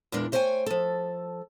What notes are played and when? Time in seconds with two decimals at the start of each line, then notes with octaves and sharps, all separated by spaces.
0.12 E2 A#2 G#3 D4 A#4
0.32 A3 C5 C#5 D#5 G5 G#5
0.66 F3 A4